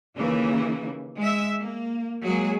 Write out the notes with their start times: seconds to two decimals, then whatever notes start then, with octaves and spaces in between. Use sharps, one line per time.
0.16 D#2 C#3 E3 A#3
1.17 G#3 E5
1.58 A#3
2.24 F#3 G#3 A#3 G#4